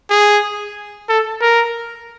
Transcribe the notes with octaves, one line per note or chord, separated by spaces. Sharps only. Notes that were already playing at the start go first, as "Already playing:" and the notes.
G#4
A4
A#4